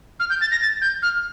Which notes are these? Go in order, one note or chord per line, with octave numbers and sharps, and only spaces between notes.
F6
G6
A6
A#6
A6
G6
F6